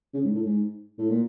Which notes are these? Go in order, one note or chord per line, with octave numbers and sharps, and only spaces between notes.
C#3
G#2
A2
G#2
A2
A#2